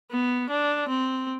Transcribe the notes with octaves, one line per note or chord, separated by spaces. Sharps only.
B3
D4
C4